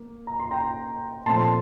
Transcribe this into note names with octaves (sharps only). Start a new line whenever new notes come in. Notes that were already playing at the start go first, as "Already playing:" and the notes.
Already playing: A#3
A#5
C6
G5 A#5
A#2 F3 A3 C4 A5 C6